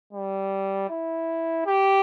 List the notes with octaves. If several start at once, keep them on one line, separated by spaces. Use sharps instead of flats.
G3
E4
G4